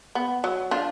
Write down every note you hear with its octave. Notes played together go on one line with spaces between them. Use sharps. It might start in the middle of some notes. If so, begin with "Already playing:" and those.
B3
F#3
D4 F4